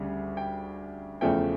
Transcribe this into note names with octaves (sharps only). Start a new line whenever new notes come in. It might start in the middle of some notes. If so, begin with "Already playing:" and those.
Already playing: D2 C#3 G3
G5
E2 C#3 F3 A3 G5